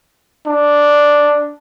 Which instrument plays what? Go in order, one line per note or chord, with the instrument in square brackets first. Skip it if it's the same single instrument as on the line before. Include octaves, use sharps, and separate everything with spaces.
[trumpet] D4